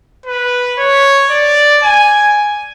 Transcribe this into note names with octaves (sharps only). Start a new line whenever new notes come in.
B4
C#5
D5
G#5